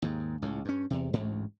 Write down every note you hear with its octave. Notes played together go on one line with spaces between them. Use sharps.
D#2 G#2
C#2 A2
G2 C#4
E2 C3
A1 D2 G#2